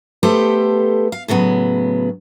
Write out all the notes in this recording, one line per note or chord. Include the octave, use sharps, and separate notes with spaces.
A3 B3 G4 A4 C5
F5
A2 C#3 F#3 B3